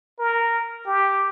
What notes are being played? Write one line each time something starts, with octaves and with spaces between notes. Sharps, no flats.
A#4
G4